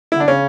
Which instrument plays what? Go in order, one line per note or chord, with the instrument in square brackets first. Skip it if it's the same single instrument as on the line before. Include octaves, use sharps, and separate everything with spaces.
[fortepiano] E4
[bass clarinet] D3 [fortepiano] D4
[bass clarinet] C#3 [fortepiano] C#4